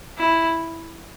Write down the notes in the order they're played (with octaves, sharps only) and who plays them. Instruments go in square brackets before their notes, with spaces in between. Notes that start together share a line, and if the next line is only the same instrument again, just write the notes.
[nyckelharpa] E4